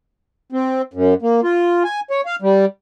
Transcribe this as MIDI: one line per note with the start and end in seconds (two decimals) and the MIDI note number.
0.52 0.82 60
0.94 1.14 42
1.22 1.41 58
1.43 1.83 65
1.84 2.00 80
2.11 2.21 73
2.26 2.36 77
2.42 2.65 55